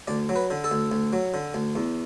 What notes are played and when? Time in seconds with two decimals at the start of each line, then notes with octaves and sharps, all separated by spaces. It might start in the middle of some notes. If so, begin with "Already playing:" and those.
0.07 D2 D5
0.29 F#3
0.36 B4
0.51 D3
0.64 A4
0.71 D2
0.92 D2
1.13 F#3
1.34 D3
1.54 D2
1.75 E2